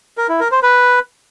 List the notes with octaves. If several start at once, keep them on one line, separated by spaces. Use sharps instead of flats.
A#4
E4
A#4
C5
B4